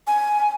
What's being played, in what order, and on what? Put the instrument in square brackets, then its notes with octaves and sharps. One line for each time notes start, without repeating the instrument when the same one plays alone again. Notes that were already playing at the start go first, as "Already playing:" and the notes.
[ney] G#5